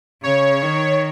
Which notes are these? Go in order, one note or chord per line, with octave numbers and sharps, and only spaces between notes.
C#3 C#5
D#3